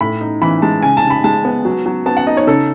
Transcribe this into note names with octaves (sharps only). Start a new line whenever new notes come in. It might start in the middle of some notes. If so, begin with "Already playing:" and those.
A2 B5
D#4
E3 B5
G#3 A5
C#3 G#5
A5
C#3
B5
G#3 A5
B3
F#3
F#3
B3 A5
F#5
D#4 D#5
C#5
C#3 A4